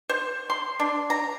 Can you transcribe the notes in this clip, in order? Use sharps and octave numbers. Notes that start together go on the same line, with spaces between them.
C5
C6
D4
A#5